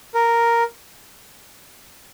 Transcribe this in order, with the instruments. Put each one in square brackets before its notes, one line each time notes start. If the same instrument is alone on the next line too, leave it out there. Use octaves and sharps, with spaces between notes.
[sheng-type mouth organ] A#4